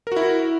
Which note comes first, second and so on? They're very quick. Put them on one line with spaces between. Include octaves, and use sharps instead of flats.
A#4 F#4 E4